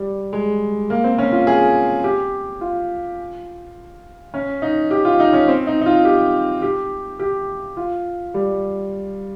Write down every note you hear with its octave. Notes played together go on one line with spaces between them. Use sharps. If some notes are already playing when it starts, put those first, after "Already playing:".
Already playing: G3
G#3
A#3
C4
C#4
F4
G#4
G4
F4
C#4
D#4
G4
F4
D#4
C#4
C4
D#4
D#4
F4
G4
G4
G4
F4
G3